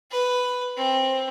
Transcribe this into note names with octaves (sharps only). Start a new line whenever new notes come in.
B4
C4